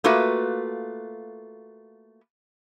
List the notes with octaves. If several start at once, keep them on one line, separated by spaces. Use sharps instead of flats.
A3 A#3 F4 F#4 B4